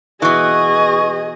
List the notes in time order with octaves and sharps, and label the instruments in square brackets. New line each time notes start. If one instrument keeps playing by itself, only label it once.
[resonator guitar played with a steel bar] B2 E3 [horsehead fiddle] G#4 D#5 [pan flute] C#6